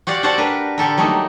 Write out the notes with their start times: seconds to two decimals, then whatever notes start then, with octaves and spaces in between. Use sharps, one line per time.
0.07 F#4 G4 D5 F5 F#5
0.23 F#4 G4 A4 C5 D5 F#5
0.37 D4 A#4 B4
0.78 D3 G4 A4 A#4
0.97 F#3 G3 A3 A#3 D#4